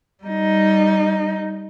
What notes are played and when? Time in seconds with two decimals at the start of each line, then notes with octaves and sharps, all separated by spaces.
0.24 G3 D#4